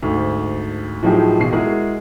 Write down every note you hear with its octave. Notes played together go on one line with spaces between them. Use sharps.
D2 G#2
A2 F3 F#3 D#4 G4 G#4
A1 B2 F4 C7
G#3 E4 F#4 G#4 A#4